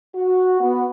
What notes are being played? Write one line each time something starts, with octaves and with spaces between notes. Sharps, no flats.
F#4
B3